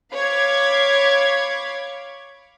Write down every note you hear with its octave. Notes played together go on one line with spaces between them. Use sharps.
C#5 F5 B5 D6 G#6